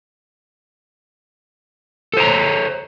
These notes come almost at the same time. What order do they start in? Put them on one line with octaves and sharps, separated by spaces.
A4 C5 A#5 C#5